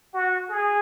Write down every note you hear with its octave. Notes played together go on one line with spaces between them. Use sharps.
F#4
G#4